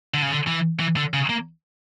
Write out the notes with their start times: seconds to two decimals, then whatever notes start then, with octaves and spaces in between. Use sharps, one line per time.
0.14 D3
0.22 C#3
0.31 D3
0.47 E3
0.80 E3
0.97 D3
1.14 C#3
1.29 A#3